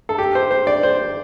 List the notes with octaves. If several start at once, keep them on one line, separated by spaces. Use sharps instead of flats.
A4
G4
C5
C5
D5
C5